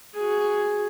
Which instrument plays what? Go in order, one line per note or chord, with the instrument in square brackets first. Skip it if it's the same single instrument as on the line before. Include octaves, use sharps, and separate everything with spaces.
[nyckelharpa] F#4 G#4